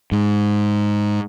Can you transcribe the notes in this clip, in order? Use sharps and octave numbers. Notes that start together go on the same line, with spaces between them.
G#2